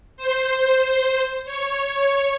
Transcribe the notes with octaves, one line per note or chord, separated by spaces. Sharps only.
C5
C#5